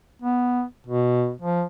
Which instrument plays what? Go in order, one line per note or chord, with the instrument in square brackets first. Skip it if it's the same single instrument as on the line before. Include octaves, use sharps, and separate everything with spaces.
[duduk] B3
B2
F3